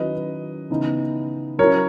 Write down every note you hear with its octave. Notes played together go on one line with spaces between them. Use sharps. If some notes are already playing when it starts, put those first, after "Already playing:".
Already playing: D#3 F#3 C#4 E4 B4 D#5
C#3 E3 B3 D#4
F#3 C#4 E4 A#4 C#5